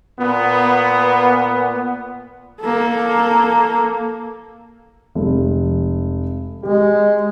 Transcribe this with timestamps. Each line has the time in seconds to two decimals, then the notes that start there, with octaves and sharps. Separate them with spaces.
0.19 A#2 B3
2.61 A#3 A4
5.15 F1 G#3
6.63 G#3 G4